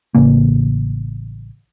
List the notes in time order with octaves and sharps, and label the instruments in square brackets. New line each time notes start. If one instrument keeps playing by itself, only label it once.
[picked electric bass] A1 C#3 A#3